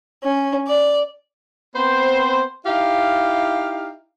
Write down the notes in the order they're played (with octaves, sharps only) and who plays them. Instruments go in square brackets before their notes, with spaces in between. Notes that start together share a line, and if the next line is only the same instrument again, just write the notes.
[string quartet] C#4
D5
[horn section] B3 C4 B4 C5
D#4 E4 G4 F5